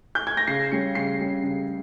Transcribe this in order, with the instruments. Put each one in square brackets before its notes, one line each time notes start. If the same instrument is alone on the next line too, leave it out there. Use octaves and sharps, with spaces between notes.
[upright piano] G6
G#6
A#6
C#3 C7
G3 C#4 C#7
C#3 C7
G3 C#4
C#3